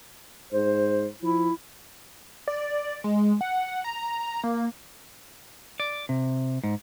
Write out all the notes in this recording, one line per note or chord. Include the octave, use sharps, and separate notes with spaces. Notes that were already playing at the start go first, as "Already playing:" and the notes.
G#2 C5
F3 E4
D5
G#3
F#5
A#5
A#3
D5
C3
G#2